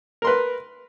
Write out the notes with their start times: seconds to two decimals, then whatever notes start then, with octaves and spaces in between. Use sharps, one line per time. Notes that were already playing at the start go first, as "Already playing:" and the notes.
0.22 A#4
0.25 C6
0.27 B4